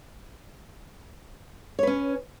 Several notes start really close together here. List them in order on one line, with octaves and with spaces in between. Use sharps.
C#5 B4 C#4